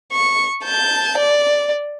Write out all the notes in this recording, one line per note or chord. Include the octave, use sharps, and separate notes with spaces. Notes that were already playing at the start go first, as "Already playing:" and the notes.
C#6
A5 G6
D5